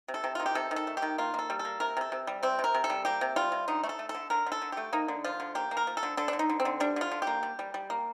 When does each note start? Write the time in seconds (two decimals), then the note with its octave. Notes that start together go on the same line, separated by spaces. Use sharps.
0.08 C3
0.14 A4
0.24 C3
0.35 D#3 F4
0.46 G4
0.55 C3 A4
0.71 D#3
0.76 A4
0.87 A3
0.97 G4
1.02 D#3
1.18 A#3 F4
1.34 A#3 A4
1.50 G3
1.59 A4
1.65 A#3
1.80 C3 A#4
1.97 C3 A4
2.12 C3
2.27 G3
2.43 C3 C4
2.59 C3
2.64 A#4
2.74 C3
2.84 A4
2.90 G3
3.05 A#3 G4
3.21 C3
3.36 G3 F4
3.52 C3
3.68 D3 D#4
3.83 A3
3.89 A4
3.99 A3
4.09 A4
4.15 D3
4.30 D3 A#4
4.46 D3
4.52 A4
4.62 D3
4.72 A3 G4
4.93 A#3 D#4
5.08 D3
5.24 F3 F4
5.40 D3
5.55 A#3 G4
5.71 A#3
5.77 A#4
5.87 F3
5.97 A4
6.03 D3
6.17 D3 A4
6.28 D4
6.33 D3
6.39 D#4
6.49 D3
6.60 C4
6.65 D3
6.80 G3 D4
6.96 D3 F4
7.11 D3
7.22 G4
7.27 A#3
7.43 G3
7.59 G3
7.74 G3
7.90 A#3